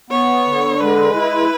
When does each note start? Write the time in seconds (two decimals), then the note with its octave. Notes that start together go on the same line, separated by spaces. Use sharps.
0.10 B3 C#5
0.46 D3
0.81 G#3 B4
1.16 E4